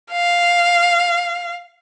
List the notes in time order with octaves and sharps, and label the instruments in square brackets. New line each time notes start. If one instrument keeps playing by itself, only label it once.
[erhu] F5